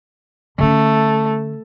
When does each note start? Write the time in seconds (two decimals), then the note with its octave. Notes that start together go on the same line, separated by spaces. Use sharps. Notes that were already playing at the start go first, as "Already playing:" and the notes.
0.59 D3 A3 C#4